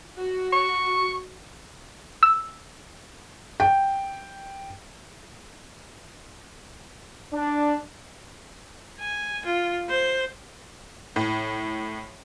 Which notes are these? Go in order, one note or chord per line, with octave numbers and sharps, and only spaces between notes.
F#4
C#6
E6
G5
D4
G#5
F4
C5
A2